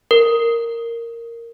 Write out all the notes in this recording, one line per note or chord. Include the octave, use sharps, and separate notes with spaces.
A#4